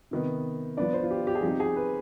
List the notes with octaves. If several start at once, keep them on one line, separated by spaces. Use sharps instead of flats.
C3 D#3 B3
F3 B3 D4 D5
C5
F4
G4
G4
G#4
F3 C4 D#4 G4
G#4
B4